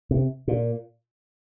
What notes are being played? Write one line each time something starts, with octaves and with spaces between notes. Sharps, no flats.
C3
A#2